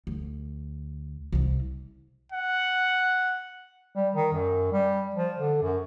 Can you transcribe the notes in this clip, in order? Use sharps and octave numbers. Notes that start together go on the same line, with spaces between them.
D2
C2 C3
F#5
G3
D#3
F#2
G3
F3
D3
F#2